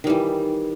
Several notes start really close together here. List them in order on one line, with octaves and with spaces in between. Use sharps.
D#3 G3 E3